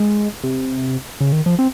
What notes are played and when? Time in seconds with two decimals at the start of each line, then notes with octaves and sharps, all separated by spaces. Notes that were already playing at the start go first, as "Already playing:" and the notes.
Already playing: G#3
0.44 C3
1.21 C#3
1.32 D#3
1.46 F3
1.59 C4